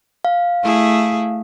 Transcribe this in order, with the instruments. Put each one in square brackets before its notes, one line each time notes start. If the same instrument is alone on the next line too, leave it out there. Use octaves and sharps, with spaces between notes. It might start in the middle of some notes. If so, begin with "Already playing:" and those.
[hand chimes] F5
[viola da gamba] A3 E4 G#4